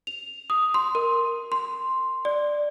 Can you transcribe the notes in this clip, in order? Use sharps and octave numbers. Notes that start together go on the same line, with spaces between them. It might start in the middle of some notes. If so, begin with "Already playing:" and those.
F7
D#6
C6
A#4
C6
D5